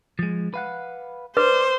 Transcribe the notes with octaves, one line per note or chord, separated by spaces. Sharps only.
F3 G#3
B4 F5 F#5
B4 C5 D5